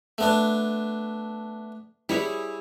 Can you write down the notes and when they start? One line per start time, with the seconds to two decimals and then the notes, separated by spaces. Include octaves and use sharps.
0.18 A3 B3 D4
2.09 G3 E4 G#4 C#5